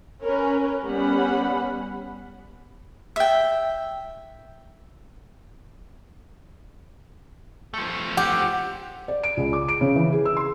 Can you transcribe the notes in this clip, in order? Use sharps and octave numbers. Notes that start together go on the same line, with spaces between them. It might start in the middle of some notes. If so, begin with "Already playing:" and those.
C#4 A#4 B4 C#5
G3 B3 C#4 F#5 B5
E5 G5
F3 A3
G4 F#5
D5
D7
C#2
D6
D7
C#3
E3
G#4
E6
C6